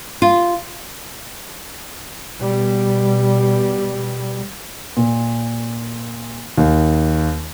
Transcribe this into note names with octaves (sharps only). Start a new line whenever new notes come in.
F4
B2 G3
A#2
D#2